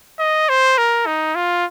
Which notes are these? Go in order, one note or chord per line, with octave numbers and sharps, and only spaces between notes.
D#5
C5
A#4
D#4
F4